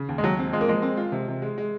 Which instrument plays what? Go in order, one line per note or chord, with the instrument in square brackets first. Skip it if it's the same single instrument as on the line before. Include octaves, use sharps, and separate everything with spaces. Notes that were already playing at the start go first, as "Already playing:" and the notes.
Already playing: [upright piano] C#3
D#2
[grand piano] G#3
[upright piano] D#2 [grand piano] F#3
[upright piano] C4
[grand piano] G#3 [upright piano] F4
[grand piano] A#3
[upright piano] F3 [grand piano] G#3
[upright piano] C4
F4
C3
C3
G#3
G#3